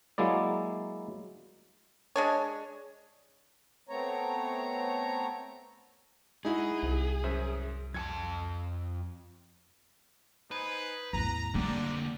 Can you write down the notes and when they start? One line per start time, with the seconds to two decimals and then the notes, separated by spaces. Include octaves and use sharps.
0.18 F#3 G#3 A#3 E4 D5
2.16 G#3 D4 C#5
3.89 A3 B3 C4 C#5 A#5
6.45 G#3 D#4 E4 F#4 G#4
6.83 C2
7.24 F#2 C5 E5
7.94 F2 G#5 A5 G#6 C#7
10.51 D#4 B4 C5 G#5 B5
11.13 A1 E2 A#5
11.54 F2 D3 G3 A#3 D4 G4 D5